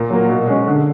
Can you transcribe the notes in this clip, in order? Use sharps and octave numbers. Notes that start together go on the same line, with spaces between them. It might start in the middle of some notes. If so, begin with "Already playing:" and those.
Already playing: A#2
F#3 A#3
B2
G#3 C#4
D3